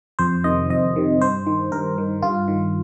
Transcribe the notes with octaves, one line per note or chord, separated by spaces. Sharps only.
F2 C5
C3 D#3 D#5
F2 D#5
C3 D#3
G2 C5
D#3
G2 A#4
D#3
G2 F4
D#3